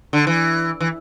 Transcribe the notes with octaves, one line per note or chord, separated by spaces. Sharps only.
D3
E3
E3